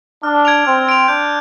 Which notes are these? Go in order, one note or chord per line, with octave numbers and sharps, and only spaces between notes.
D4 F6
G#6 D7 F7
C4 F6
G#6 D7 F7
D4 G6